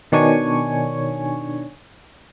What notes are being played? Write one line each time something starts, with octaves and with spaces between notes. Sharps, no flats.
B2 D#3 D4 C#5 G#5 C#6